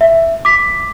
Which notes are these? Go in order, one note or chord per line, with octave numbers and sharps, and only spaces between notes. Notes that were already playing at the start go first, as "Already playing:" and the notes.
E5
D6 B6